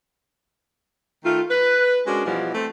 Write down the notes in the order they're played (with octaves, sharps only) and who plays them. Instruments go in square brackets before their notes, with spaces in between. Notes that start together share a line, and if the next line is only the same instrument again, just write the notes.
[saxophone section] D#3 A3 F4
B4
G#3 C#4 D4 F#4 A#4
B2 E3 F3 G3 E4
A3 C4